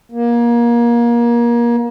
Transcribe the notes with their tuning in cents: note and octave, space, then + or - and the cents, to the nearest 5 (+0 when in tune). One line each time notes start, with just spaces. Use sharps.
A#3 +25